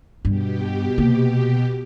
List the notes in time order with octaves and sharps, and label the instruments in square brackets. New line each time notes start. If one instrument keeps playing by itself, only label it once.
[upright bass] G2 [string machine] B2 G4
[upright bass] C3 A#3